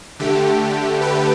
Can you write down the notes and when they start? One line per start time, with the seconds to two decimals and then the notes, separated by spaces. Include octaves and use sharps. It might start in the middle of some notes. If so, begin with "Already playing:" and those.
0.19 D3 A3 G4
1.01 G4 B4